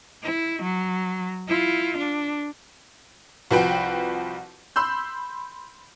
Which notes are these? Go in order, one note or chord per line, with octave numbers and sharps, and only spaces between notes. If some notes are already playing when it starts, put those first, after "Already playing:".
E4
F#3
E4 F4
D4
C2 F3 F#4 B4 G5
B5 C6 E6 G6